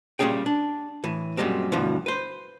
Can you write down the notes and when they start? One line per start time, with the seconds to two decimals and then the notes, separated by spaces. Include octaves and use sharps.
0.19 A#2 G3 C4 C#4 G#4 G5
0.46 D4
1.04 A2 E3
1.37 F#2 A#2 G3 G#3 C4
1.72 D2 G2 B2 E3 F3
2.06 B4 C5